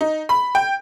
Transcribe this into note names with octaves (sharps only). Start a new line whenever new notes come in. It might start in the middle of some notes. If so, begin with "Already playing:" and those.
D#4
B5
G5